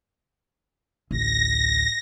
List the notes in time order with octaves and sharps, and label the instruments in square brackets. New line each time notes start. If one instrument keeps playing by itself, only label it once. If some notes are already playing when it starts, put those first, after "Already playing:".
[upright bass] A1 D2 [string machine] A#6